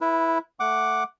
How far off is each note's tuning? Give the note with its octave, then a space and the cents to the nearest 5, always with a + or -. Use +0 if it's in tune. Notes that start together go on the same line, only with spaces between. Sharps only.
E4 +0 B4 -25
A3 +0 F#5 +0 D6 +0